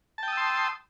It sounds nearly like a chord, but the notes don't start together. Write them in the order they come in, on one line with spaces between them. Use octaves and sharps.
A5 G5 D#6 E6 C6